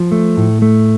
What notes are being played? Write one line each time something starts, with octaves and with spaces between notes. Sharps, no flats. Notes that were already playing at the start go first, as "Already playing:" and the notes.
Already playing: F3
A3
A2
A3